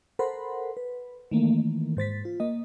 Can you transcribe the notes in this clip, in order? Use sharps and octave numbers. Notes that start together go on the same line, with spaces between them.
A4 A#4 C5 F#5 B5 C6
B4
D#3 E3 A3 A#3
G#2 C5 A6 B6
F4
A#3 D#5